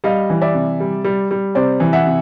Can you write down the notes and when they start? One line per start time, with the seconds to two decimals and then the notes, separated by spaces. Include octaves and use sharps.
0.04 G3 D#5 F5
0.30 E3
0.41 D5 E5
0.54 C3
0.80 G3
1.04 G3
1.31 G3
1.55 C3 C5 D5
1.80 E3
1.93 E5 F#5
2.06 C3